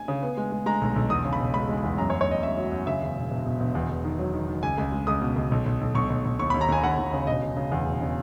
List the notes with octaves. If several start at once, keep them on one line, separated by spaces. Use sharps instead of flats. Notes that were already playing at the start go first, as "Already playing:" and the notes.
Already playing: G#5
C#3
B3
G#3
G#3
G#3 A#5
B1
B1
E2 D#6
C#3
B5
E1
G#3 B5
G#3
E2
F#2 A#5
C#5
F#2
C#5
F#2 D#5
F#2 E5
F#3
F#2
C#3 E5
E2
E1
E1
E1
E1
E2
E2
D#3
F#3
D#3
D#3
C#2 G#5
C#2
G#3
C#2 D#6
B2
C#2
B1
B1
B1
B1 C#6
B1
B1
D#2 C#6
B5
D#2
A#5
D#2 G#5
D#2 F#5
D#2
C#3
E1 D#5
C#3
C#3
E2
E1
C#3